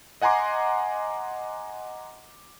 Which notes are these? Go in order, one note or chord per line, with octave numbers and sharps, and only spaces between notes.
D#5 F#5 G#5 A#5 C6 D6